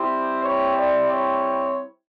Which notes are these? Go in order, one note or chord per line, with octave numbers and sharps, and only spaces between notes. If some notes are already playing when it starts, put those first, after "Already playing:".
Already playing: G3 C4 E4 G4 C5
C#5
D5
C#5